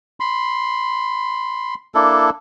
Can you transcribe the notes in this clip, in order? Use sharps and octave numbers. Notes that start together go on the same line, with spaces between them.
B5 C6
A#3 D4 E4 A4